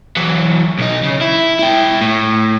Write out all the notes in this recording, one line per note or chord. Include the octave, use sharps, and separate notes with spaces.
E3 F#3
B1 D#4
C#3
E4
E4 G5
A2